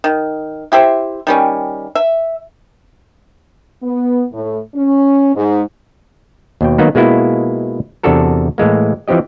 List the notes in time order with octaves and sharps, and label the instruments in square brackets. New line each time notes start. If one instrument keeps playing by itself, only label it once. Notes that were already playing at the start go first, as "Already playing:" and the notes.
[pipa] D#3
E4 G4 C5 E5
D#3 G3 C#4
E5
[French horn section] B3
A2
C#4
G#2
[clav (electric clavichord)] D#2 B2 G5
D#3 F#3 A#3 B3 D#4
B2 G#3 A#3 B3 E4 F4
E2 C3 D4 F#4 A4 A#4
A2 E3 G#3 A#3
E3 F3 C4 G4 D#5